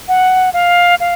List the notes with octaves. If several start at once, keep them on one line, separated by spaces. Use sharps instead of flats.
F#5
F5
F5